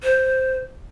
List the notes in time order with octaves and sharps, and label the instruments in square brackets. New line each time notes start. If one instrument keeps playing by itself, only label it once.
[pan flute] C5